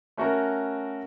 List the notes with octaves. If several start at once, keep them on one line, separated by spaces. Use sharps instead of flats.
A3 C#4 F#4 A#4